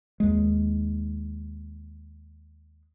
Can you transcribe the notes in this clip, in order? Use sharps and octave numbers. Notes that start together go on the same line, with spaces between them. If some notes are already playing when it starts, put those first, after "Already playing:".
D#2 G#3